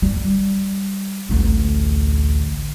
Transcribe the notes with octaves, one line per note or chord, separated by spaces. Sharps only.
G3
A1 D2